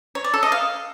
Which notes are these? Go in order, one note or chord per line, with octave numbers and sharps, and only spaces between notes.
C#5
D5
A4
D#5
F5